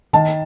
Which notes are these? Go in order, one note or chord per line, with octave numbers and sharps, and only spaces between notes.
D#3 A5